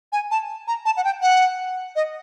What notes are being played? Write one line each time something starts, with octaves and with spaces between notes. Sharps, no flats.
G#5
A5
A#5
A5
F#5
G5
F#5
D#5